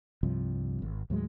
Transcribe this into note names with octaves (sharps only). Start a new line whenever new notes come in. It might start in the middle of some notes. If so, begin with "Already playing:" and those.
C2 G2 C3 F3
G#1
D#2 A2 F#3 G#3